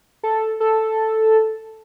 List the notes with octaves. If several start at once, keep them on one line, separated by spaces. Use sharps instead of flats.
A4
A4